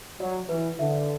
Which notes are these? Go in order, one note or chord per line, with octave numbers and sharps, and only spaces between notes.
F#3 D5
E3 B4
D3 E5